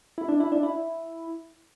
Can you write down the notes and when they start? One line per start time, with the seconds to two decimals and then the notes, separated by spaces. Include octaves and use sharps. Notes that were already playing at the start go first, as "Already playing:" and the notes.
0.18 E4
0.28 D4
0.40 E4
0.52 D4
0.63 E4